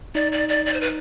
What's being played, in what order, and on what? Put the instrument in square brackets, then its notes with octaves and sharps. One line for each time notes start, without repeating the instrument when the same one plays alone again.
[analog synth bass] D#4 [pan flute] D5
[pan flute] D5
D5
D5
C5
B4